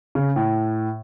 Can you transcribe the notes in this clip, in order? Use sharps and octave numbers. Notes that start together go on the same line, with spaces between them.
C#3
A2